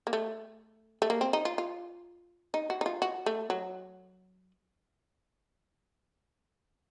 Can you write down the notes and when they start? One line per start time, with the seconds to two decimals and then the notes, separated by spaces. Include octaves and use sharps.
0.07 A#3
0.13 A3
1.02 A3
1.10 A#3
1.21 C4
1.33 D#4
1.45 F4
1.58 F4
2.54 D#4
2.70 F#4
2.81 D#4
2.86 F4
3.02 F#4
3.26 A3
3.50 F#3